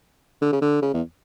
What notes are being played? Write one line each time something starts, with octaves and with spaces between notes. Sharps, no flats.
D3
C#3
D3
C#3
E2